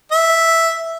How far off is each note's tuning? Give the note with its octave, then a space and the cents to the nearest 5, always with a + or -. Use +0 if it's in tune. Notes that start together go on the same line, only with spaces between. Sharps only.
E5 +0